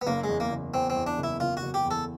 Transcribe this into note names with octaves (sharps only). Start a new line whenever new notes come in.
B3
F#1 A#3
G#3
E2
A#3
F#1
E2 C4
C4
E2
D4
F#1 E4
F#1 F4
F#4
F#1
G4
E2
A4